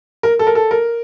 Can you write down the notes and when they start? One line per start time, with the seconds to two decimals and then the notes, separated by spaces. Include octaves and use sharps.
0.23 A#4
0.39 A4
0.47 A#4
0.55 A4
0.71 A#4